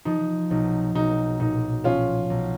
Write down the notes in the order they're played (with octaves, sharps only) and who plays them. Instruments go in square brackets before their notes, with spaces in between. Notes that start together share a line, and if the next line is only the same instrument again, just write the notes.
[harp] F3 [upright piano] D#4
[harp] B1 [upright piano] D#4
[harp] B1 [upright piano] D#4
[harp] A#2 [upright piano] D#4
[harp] F3 [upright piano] C#4 F4
[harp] B1